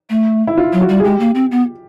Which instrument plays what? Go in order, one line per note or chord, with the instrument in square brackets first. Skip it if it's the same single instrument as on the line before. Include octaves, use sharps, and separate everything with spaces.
[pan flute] A3
[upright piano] E4
F4
[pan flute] F#3
[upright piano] F#4
[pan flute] G3
[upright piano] G#4
[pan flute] G#3 [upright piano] G4
[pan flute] A#3
C4
B3